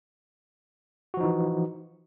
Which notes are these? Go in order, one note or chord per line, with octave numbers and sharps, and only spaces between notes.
E3 F3 D#4 F#4